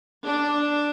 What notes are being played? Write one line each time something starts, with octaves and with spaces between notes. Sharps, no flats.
D4